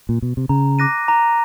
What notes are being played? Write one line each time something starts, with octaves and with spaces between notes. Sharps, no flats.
A#2
B2
C3
C#3 A#5
D6 F#6 A#6 D#7
A#5